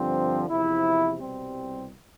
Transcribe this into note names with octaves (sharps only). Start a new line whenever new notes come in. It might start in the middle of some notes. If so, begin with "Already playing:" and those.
Already playing: G2 D3 F3 C4
E2 C3 F3 E4
C2 B2 G3 C4